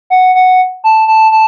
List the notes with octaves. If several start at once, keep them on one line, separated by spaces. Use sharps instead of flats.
F#5
F#5
A5
A5
A5